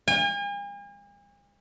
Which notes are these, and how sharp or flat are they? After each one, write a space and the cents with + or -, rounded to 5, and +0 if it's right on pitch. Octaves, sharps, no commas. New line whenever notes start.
G#5 -45